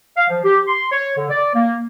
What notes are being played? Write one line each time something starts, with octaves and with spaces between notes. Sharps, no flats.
F5
F3
G4
C6
C#5
D3
D5
A#3